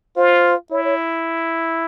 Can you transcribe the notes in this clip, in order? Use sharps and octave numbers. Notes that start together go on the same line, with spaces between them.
F4 C5
E4 C#5
C#5